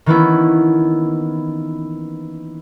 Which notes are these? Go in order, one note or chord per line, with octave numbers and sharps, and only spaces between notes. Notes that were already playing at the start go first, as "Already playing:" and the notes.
D#3 E3 A#3 B3 C#4 E4